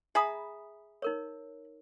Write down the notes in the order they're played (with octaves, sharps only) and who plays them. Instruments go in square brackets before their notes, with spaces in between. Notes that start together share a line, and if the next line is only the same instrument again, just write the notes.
[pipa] G#4 B5 [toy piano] E5 A#5 D#6
[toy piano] D#4 A#4 C#5